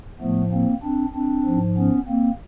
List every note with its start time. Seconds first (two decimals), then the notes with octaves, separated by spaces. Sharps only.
0.20 A2 F3 A3 B3
0.52 A#3 C4
0.83 C4 D4
1.14 C4 D4
1.46 G#2 F3
1.77 B3 C#4
2.08 A#3 C4